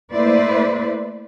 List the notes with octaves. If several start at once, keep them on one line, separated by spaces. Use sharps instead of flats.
A3 A#3 E4 B4 C5 D5